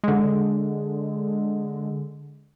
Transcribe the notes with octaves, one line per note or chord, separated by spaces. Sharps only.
D3 G#3